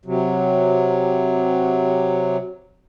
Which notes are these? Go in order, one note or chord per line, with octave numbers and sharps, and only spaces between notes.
C3 F#3